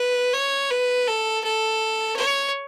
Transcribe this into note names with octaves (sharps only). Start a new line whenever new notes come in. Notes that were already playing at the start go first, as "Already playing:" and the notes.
Already playing: B4
C#5
B4
A4
A4
C#5